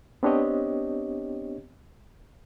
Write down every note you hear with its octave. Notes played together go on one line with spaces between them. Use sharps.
B3 C4 D4 G4 C#5 D#5